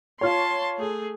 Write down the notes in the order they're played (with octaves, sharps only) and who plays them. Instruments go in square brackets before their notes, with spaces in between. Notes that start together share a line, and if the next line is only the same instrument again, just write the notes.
[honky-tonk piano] F4 C#5 [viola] A5 C6
[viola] A3 G#4